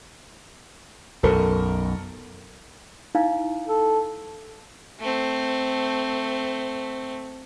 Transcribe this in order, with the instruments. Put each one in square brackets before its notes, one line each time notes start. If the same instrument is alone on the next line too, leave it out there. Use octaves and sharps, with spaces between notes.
[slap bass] B1 F#2 [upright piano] A4 A#4
[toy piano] D#4 E4 F5
[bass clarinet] A4
[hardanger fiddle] A3 C4